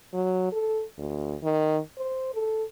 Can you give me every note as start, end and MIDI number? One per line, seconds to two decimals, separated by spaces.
0.14 0.48 54
0.52 0.83 69
0.98 1.35 38
1.43 1.79 51
1.97 2.32 72
2.34 2.64 69